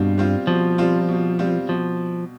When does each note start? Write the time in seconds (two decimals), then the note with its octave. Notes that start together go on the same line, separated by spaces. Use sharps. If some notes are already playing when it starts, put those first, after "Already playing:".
Already playing: G2 B2 G3 C4 F4
0.18 G3 C4 F4
0.47 B2 F3
0.78 G3 C4 F4
1.09 B2
1.39 G3 C4 F4
1.69 B2 F3